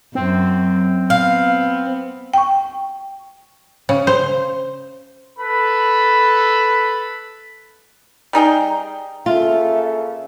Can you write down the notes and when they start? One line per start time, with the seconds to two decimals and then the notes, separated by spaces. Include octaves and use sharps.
0.15 F#2 C4
1.10 B3 F5
2.34 G5 C#6
3.89 C#3
4.07 C5
5.38 A4 B4 B5
8.33 G3 D#4 G#4 G5
9.26 C#3 A#3 F4 A4 E5